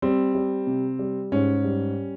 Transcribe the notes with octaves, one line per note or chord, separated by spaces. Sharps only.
G3 C4
G3
C3
G3
G#2 C#4
G3